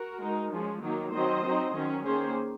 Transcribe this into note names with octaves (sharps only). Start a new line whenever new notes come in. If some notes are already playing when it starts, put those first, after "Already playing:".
Already playing: F#4 A#4
G#3 D#4
F3 G#3 C#4
D#3 F#3 A#3 D#4
D#3 F#3 C4 C5 D#5
F#3 C4 D#4
D#3 F#3 C#4
D#3 A#3 C#4 G#4 C5